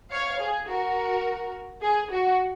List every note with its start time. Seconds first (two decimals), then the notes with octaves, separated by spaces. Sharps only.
0.11 C#5 F5
0.40 G#4
0.68 F#4 A#4
1.82 G#4
2.11 F#4